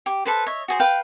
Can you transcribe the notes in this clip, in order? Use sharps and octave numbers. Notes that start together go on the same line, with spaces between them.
G4
A4 B4 C5
C#5 D#5 E5
F#4 G#4 C5
B4 F5 G5